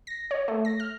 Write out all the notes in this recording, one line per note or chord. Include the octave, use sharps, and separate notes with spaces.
A#6
C#5
A3
A#6
F6